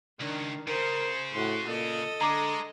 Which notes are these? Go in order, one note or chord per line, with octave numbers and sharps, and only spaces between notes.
C#2 D#3 D4
C#3 A#4 C5
A2 F#4 C6
A#2 A4 D#5
D3 G#3 A#5 D6